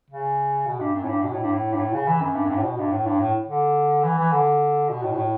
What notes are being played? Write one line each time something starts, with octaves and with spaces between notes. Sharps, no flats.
C#3
B2
G2
F#2
A2
G2
B2
A2
G2
A2
G2
A2
C#3
E3
F#2
G2
F#2
G2
A2
B2
G2
A2
G2
A2
D3
E3
E3
D3
B2
A2
B2
A2